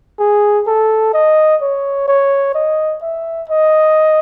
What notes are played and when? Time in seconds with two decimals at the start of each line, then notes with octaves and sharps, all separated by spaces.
0.20 G#4
0.67 A4
1.14 D#5
1.62 C#5
2.08 C#5
2.55 D#5
3.02 E5
3.50 D#5